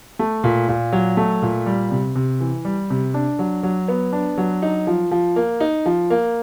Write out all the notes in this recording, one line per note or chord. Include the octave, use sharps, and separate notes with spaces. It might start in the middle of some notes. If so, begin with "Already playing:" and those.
A3
A#2
A#2
F#3
A3
A#2
G3
C3
C3
E3
G3
C3
D4
F#3
F#3
B3
D4
F#3
D#4
F3
F3
A#3
D#4
F3
A#3